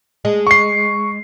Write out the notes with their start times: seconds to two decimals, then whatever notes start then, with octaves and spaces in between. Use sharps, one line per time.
0.25 G#3
0.47 C#6 C7